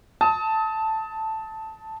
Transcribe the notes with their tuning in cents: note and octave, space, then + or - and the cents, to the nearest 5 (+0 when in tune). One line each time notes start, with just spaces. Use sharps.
A5 +0 D#6 +35